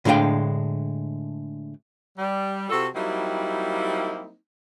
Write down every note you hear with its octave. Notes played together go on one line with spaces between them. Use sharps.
A2 D3 G#3 D4 F5 G5
G3
C3 F4 F#4 A4
F#3 G3 A#3 C4 D#4 E4